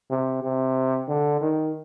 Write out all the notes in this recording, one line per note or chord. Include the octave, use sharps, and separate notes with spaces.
C3
C3
D3
D#3